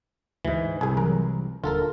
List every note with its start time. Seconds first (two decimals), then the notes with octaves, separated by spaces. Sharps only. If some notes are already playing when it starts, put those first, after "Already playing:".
0.45 D2 G#2 E3
0.81 C2 G#4 G#5
0.97 E3 F#3 A#4
1.64 D#1 D3 F4 A4 A#4